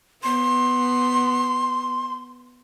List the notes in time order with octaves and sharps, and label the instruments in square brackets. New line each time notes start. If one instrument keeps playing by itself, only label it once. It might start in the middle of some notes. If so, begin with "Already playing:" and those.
[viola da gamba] B3 [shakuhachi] C6